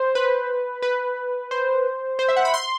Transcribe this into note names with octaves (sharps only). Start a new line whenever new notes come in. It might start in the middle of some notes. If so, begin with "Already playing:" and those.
Already playing: C5
B4
B4
C5
C5
E5
F#5
B5
C6